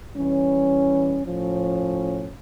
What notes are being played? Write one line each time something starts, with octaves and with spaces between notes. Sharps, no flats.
E3 G3 C#4
A2 F3 C#4